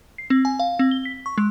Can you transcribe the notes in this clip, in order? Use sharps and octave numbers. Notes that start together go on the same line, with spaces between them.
C7
C4
G#5
F5
C4
G7
B6
C#6
G#3